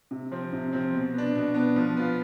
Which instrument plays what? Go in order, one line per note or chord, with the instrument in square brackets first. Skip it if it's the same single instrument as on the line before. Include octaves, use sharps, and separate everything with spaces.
[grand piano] C3
F3 C4
C3
F3 C4
B2
B3 D4
B2
B3 D4
F3
B3 F4